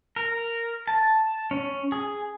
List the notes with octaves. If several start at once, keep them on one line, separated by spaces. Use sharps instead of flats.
A#4
A5
C#4
G#4